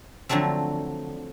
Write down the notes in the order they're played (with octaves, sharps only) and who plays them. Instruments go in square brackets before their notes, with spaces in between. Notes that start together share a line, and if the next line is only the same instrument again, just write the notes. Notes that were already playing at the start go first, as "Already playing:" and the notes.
[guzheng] D3 F3 F#3 A3 C4